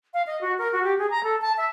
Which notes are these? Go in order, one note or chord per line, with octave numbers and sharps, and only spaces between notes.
F5
D#5
F#4
A#4
F#4
G4
G#4
A#5
A4
A5
E5